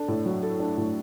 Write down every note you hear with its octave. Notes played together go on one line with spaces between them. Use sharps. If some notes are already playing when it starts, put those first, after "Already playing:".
Already playing: D4 A4
A2
F#3
A4
D4
A2